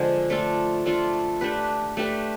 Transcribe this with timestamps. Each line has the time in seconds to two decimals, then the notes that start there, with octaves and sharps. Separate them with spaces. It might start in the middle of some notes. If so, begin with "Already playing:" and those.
Already playing: D3 F3 G#3
0.30 A3 D4 F4 A4
0.86 A3 D4 F4 A4
1.41 A3 D4 G4 B4
1.97 A3 D4 G4 B4